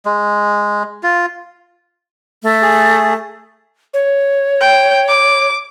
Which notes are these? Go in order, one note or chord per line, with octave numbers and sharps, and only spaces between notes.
G#3
F4
A3
G#4
C#5
G5
D6